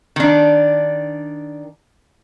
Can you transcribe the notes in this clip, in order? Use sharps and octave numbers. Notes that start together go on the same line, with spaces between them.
D#3 D4